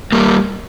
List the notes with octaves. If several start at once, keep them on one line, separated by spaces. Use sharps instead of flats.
G3 A#3